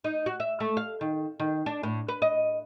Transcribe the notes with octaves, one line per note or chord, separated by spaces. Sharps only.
D#4
F#4
E5
A3
F5
D#3
D#3
D4
A2
B4
D#5